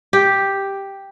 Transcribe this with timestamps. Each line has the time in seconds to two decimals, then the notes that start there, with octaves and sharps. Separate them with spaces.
0.13 G4